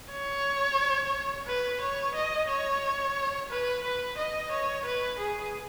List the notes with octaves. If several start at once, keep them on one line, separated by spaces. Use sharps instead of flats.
C#5
B4
C#5
D#5
C#5
B4
B4
D#5
C#5
B4
G#4